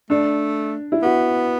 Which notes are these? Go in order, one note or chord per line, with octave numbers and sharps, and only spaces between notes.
A3 D4
E4
B3 F#4